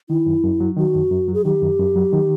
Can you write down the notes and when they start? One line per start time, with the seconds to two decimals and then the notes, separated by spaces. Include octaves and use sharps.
0.10 D#3 E4
0.26 F#2
0.43 F#2
0.60 F#3
0.77 D#3 F#4
0.94 F#2
1.11 F#2
1.28 F#3
1.34 G#4
1.45 D#3 G4
1.62 F#2
1.79 F#2
1.96 F#3
2.13 D#3